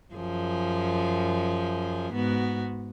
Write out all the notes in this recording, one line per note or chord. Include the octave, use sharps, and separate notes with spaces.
F#2 F3 G#4
G#2 B3 F#4